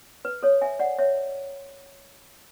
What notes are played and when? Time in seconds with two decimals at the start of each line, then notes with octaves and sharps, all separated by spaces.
0.25 B4
0.43 A4 C#5
0.61 E5 G#5
0.79 D5 F#5
0.98 C#5 E5